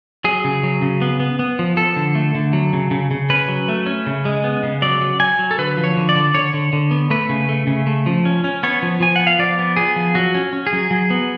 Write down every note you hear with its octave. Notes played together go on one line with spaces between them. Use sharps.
F#3 G#4
C#3
F#3
C#3
B3
B3
B3
F3
F3 A4
D3
A3
D3
F#3
C#3
C#3
C#3
C#4 B4
F#3
A3
C#4
C#3
G#3
B3
C#3
F#3 D5
F#3
F#3 G#5
F#3
A4
D3 B4
F3
C#5
D3
D5
D3
D3 C#5
D3
D3
B3
A3 B4
C#3
A3
C#3
A3
F3
C#4
C#4
B3 C#5
F3
F3 G#5
B3 F#5
F5
F3 D5
B3
B3 G#4
F3
F#3 F#4
C#4
C#4
G#4
F#3
F#3
B3